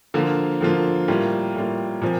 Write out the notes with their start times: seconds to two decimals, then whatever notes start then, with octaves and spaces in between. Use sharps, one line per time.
0.14 D3 F3 A#3 F4
0.61 D3 F3 A#3 F4
1.08 A2 G3 A#3 F4
1.55 A2 G3 A#3 F4
2.02 A#2 F3 C4